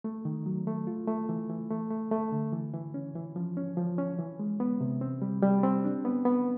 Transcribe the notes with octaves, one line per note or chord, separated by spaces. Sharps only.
A3
D#3
F#3
A3
F4
A3
E3
E3
A3
A3
A3
D3
E3
E3
C#4
E3
F3
C#4
F3
C#4
E3
G#3
B3
C3
C4
G3
G3
C4
D4
B3
B3